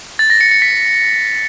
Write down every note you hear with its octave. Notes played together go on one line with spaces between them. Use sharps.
A6
A#6
C#7
C#7
B6